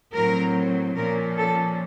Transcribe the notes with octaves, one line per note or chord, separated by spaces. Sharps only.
A2 F#3 C4 A#4
A#2 F3 A#3 C#4 A#4
A4